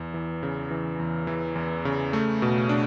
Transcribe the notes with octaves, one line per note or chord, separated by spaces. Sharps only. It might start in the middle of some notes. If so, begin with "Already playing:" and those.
Already playing: E2
E3
C#3
E3
E2
E3
E2
C#3
A3
B2
D4